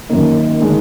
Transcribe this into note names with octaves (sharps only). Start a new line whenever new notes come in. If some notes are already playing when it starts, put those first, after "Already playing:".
F#2 D#3 A#3 D#4
D#3 G#3 D4